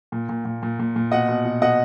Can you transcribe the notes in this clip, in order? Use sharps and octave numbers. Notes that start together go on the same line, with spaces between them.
A#2
A#2
A#2
A#2
A#2
A#2
B2 D#5 F#5
B2
B2
B2 D#5 F#5